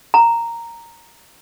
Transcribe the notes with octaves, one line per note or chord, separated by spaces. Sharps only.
A#5